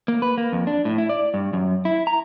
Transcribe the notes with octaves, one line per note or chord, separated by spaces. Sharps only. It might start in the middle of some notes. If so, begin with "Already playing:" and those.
A#3
B4
A#3
F2
D4
A2
E4
D5
G2
F#2
E4
A#5